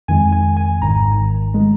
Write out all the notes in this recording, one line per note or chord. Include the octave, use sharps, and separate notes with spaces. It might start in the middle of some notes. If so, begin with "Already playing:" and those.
F2 D#3 G#3 G#5
G#5
G#5
G#1 G#2 D#3 A#5
D#3 G#3